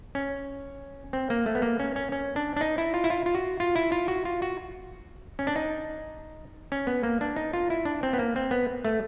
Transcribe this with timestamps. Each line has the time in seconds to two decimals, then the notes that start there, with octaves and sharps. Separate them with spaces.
0.15 C#4
1.13 C4
1.30 A#3
1.46 A3
1.55 B3
1.62 A#3
1.79 C#4
1.96 C#4
2.12 C#4
2.36 D4
2.56 D4
2.61 D#4
2.78 E4
2.94 F4
3.04 E4
3.10 F4
3.26 F4
3.35 F#4
3.60 F4
3.76 E4
3.92 F4
4.08 F#4
4.25 F4
4.42 F#4
5.39 C#4
5.47 D4
5.56 D#4
6.72 C#4
6.87 B3
7.03 A#3
7.21 D4
7.36 D#4
7.53 F4
7.70 E4
7.85 D4
8.03 C4
8.13 B3
8.19 A#3
8.36 C4
8.51 B3
8.85 A3